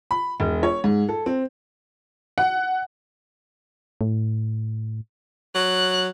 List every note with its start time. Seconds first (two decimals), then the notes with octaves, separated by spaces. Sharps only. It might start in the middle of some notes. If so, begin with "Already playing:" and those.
0.11 B5
0.40 E1
0.63 C#5
0.84 G#2
1.09 A4
1.26 C4
2.38 F#5
4.01 A2
5.55 F#3 F#6